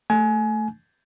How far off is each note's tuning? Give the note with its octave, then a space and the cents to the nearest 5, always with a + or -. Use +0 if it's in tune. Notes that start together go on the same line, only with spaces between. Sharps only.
A3 +5 G#5 +25